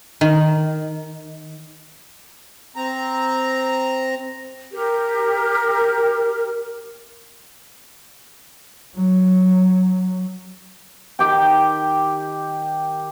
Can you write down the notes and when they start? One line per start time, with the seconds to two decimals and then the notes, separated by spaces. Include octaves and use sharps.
0.21 D#3
2.76 C4 A#5
4.72 G4 A#4
8.96 F#3
11.19 D#3 G4 G5